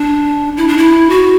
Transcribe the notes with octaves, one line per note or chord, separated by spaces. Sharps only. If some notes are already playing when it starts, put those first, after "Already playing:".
Already playing: D4
E4
D4
E4
F#4